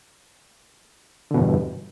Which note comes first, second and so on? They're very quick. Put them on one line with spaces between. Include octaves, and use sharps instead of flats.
D3 B2 E2 G2